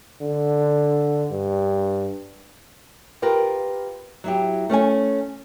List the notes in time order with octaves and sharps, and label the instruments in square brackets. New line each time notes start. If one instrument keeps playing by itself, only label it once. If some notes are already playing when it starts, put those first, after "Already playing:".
[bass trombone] D3
G2
[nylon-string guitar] F4 G4 A#4 B4
F#3 E4 G4
A3 C#4 C#5 G#5